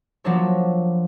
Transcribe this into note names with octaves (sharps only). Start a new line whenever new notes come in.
F3 F#3 A#3 D4 A4 C#5